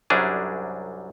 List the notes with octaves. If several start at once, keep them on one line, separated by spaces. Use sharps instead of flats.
C2 F#2 F#3 G3 D4 G#4